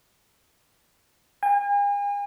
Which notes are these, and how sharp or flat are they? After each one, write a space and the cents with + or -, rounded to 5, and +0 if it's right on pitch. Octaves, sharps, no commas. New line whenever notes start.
G#5 -40